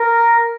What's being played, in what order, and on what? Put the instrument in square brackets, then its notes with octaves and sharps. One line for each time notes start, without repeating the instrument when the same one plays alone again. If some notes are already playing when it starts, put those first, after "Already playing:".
Already playing: [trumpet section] A#4